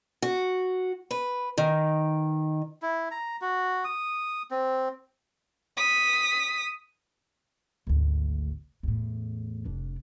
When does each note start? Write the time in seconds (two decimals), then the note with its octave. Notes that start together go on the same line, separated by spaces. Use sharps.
0.22 F#4
1.11 B4
1.58 D#3
2.82 E4
3.11 A#5
3.41 F#4
3.85 D#6
4.51 C4
5.77 D#6 B6
7.87 G#1 D2
8.83 E2 A2
9.65 F1 D4